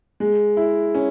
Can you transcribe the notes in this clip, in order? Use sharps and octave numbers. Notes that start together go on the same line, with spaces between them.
G#3
E4
C#4